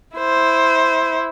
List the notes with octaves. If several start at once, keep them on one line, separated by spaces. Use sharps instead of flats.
E4 C5